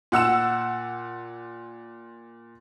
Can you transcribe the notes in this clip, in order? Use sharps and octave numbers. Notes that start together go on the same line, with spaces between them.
A#2 F#5 E6 E7